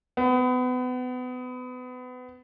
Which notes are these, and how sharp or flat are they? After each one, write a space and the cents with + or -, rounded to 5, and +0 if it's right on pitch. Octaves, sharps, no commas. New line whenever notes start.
B3 +30